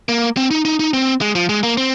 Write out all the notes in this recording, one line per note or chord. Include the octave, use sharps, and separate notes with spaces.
A#3
C4
D#4
D#4
D#4
C4
G#3
F3
G#3
A#3
C4